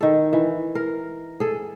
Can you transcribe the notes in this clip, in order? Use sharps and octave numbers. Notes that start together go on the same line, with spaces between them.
D#3 A4
E3
A#4
G#4 A4